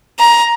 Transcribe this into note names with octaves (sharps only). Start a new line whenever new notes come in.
A#5